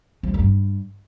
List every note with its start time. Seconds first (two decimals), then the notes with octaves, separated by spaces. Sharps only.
0.23 F3
0.29 D3
0.34 G3
0.39 G2